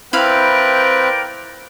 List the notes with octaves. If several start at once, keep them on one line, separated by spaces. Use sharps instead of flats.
C4 E4 A#4 B4 D5 F5 G5 B5